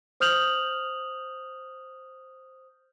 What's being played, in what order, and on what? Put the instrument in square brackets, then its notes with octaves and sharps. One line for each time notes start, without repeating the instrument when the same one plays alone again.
[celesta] C5 D#6 F6 G6 F7 F#7